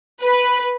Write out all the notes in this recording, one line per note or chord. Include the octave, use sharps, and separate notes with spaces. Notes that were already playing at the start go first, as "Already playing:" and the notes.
B4